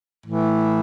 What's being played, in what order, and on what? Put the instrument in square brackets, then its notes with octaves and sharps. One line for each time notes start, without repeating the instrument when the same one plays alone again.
[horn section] A2 E3